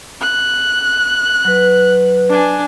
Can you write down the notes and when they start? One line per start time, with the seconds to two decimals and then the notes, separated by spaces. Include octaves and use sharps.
0.21 F#6
1.45 F#3 B4
2.30 D4 G#5